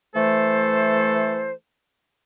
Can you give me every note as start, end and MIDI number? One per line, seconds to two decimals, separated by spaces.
0.14 1.51 52
0.14 1.51 57
0.14 1.51 69
0.14 1.51 72